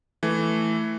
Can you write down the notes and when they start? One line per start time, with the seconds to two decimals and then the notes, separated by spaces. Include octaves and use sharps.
0.23 E3 A3